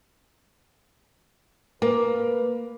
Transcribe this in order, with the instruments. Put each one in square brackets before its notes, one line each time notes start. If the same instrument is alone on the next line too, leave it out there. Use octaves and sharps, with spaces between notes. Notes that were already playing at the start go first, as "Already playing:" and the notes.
[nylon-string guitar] A#3 [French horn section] B4